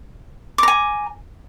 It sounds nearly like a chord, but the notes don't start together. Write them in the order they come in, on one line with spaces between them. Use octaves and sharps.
D6 A#5 G#5